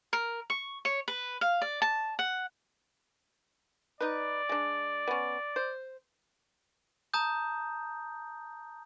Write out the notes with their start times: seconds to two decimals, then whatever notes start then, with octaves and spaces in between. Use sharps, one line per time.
0.13 A#4
0.50 C#6
0.85 C#5
1.08 B4
1.41 F5
1.62 D5
1.82 A5
2.19 F#5
4.01 D#4 B4 D5
4.49 G#3 D4
5.07 B3 C#4
5.56 C5
7.14 A5 A#5 D#6 G6